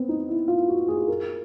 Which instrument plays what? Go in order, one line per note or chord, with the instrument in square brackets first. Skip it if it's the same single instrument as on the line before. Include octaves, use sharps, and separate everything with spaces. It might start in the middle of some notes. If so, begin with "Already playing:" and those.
Already playing: [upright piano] B3 C4
D#4
E4
F4
F#4
G#4
A#4